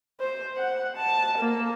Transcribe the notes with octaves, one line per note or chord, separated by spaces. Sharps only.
C5
F#5
A5
A#3